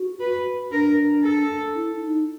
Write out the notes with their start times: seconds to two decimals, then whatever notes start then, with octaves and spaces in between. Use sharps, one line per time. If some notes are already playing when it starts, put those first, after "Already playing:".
Already playing: F#4
0.20 B4
0.71 D4 A#4
1.23 A4
1.75 E4
2.01 D#4